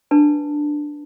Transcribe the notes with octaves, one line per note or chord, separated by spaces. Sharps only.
D4 B4 A5